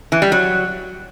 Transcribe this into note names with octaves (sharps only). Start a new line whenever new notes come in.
E3
G3
F#3